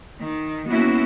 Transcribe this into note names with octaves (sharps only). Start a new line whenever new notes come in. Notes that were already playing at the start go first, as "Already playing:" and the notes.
D#3
A#3 B3 C#4 E4 F#4